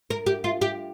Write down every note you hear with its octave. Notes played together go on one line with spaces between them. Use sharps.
A#4
G4
F4
G4